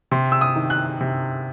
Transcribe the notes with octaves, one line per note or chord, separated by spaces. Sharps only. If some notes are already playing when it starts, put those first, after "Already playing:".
C3 C6
E6
D#6
D#3
F#6
C3